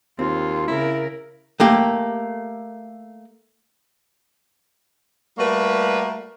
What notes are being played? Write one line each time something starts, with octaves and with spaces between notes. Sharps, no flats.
D#2 C4 F4
C#3 E4 A#4
A3 A#3 G4
G3 A3 A#3 F#4 A#4 B4